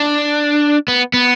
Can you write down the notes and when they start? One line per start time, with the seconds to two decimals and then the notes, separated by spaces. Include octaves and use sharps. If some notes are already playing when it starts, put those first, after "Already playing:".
Already playing: D4
0.88 B3
1.14 B3